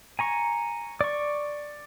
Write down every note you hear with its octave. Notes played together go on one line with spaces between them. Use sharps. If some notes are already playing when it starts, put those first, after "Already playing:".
G#5 A#5 C#6
D5 C#6